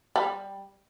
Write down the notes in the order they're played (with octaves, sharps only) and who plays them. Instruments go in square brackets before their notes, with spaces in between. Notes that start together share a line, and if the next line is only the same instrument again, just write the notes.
[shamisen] G3